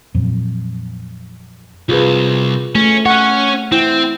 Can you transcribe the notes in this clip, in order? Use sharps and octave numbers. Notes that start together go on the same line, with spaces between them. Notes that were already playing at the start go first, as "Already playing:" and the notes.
F2 A#2 F#3
C2 F4 G#4 B4
A3 C#4
C#4 C#5 F#5
C4 E4